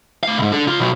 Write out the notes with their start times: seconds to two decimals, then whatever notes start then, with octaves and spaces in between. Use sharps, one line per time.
0.23 A3 F5
0.38 C2 G#2
0.52 D4 A4
0.67 C#3 F4
0.80 B2 F#3